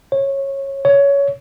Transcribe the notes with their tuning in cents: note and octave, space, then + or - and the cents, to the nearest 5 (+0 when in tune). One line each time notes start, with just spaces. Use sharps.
C#5 -15
C#5 +20